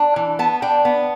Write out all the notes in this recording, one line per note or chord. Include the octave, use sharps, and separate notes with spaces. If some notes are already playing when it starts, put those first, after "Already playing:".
Already playing: D4
E3
B3 A5
D4 G5
B3